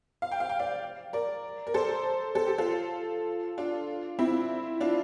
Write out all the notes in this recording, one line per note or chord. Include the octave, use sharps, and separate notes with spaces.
F5
G5
F5
G5
D5 F5
A#4 D5
A#4
A4 C5
A4
G4
F4 A4
D4 F4
C4 E4
D4 F4